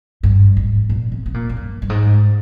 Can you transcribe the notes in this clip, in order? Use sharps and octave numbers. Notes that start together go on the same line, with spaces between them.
G2
G#2
A#2
C3
C3
A#2
F2
G2
G2
G#2